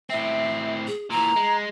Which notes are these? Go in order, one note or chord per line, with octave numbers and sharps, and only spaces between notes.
A2 C4 E5
G#4
A#2 E3 A#5
G#3